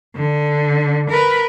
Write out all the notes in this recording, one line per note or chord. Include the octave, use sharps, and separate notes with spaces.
D3
A#4 B4